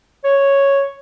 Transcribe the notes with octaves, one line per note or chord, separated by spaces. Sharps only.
C#5